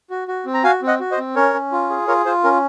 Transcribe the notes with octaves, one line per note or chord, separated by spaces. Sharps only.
F#4
F#4
C4
A#5
F#4 F5 G#5
C4
D#5 F#5
F#4
C5 D#5
C4
C#4 A#4 C#5
C#4
F4
G#4
F4 A#4 C#5
F4 C5
C#4 A#4